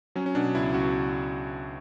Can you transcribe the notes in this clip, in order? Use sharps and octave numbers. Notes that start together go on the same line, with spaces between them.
F#3 C#4
C#4
B2 D4
C#2 E4
C#2 F#4